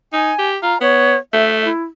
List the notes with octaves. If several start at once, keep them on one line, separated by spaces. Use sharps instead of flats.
D#4 G#5
G4
F4 A#5
B3 C#5
A3 E5
E4